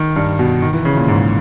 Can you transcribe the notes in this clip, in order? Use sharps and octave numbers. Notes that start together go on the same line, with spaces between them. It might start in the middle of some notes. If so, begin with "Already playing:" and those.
Already playing: D#3
G2
B2
D#3
E3
C#3
A#2
G#2